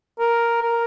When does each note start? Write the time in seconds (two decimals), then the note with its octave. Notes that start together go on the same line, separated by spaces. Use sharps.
0.20 A#4
0.62 A#4